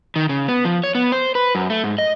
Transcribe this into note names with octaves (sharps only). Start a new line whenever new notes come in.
D#3
C#3
B3
F3
C#5
B3
C5
B4
F#2
A3
G#2
D#5